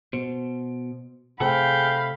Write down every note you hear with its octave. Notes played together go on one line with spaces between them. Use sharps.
B2 C5
C3 A3 G#4 A4 C5 F5 G5 B5